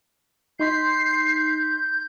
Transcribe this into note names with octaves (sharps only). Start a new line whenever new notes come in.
D#4 C6 G6 B6 C7